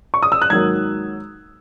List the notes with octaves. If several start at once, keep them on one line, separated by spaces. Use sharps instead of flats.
C#6
D#6
E6
F#6
G#2 D#3 F#3 A#3 G#6